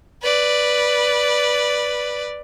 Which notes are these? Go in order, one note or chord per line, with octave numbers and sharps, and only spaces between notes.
B4 D5